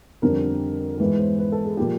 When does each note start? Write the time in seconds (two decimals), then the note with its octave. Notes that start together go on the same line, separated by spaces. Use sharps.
0.22 F2 D3 G3 C4 A#4
0.96 A#4
1.00 G#2 E3 G#3 B3 B4
1.19 C5
1.39 B4
1.52 A4
1.65 G#4
1.77 A#2 F3 A#3 G4